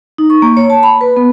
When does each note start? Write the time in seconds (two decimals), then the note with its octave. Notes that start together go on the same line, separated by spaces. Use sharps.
0.18 D#4
0.30 C#6
0.42 A#3
0.57 C#5
0.70 A5
0.83 B5
1.01 B4
1.17 B3